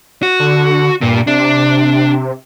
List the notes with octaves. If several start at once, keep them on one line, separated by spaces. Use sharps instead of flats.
F#4
D3
G2 A#2
C3 D4